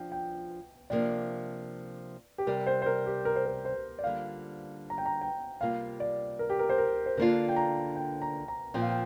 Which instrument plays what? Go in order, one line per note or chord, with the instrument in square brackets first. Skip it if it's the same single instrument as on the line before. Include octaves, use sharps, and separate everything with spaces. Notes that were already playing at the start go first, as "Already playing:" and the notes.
Already playing: [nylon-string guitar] F3 D4 F4 [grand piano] G5
[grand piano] G5
[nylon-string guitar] C3 F3 A#3 D4 [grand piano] D5
[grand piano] G4
[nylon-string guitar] C3 G3 C4 [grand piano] A#4
[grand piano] C5
C5
A#4
G4
A#4
C5
A#4
C5
D5
[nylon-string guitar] D3 G3 A#3 F4 [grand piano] F5
[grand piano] A#5
G5
A#5
G5
[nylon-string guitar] C3 G3 A#3 F4 [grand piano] F5
[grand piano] D5
A#4
G4
A#4
C5
A#4
C5
[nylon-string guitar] D3 A#3 D4 F4 [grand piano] A#4
[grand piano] G5
A#5
G5
A#5
A#5
[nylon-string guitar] A#2 F3 C4 F4 [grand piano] G5
[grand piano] F5
G5